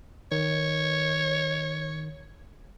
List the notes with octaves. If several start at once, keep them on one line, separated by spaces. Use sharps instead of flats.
D#3 C#5